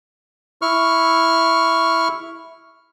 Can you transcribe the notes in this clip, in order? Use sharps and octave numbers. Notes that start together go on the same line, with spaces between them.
E4 C#6 F6